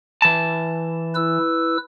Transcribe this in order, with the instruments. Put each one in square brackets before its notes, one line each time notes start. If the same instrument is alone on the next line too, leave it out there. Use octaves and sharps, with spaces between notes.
[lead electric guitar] E3 A5
[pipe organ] E4 B4 E6